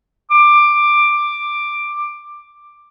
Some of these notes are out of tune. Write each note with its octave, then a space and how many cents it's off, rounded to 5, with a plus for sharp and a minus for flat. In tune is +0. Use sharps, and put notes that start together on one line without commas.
D6 +10